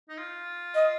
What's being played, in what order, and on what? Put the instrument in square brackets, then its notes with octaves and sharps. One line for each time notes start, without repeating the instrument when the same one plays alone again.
[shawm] D#4
F4
[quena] D#5